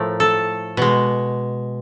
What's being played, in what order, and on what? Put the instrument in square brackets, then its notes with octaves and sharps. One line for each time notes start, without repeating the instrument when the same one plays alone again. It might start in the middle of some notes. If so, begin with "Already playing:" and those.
Already playing: [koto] A2 F3 A3 A#4
A4
B2 G#3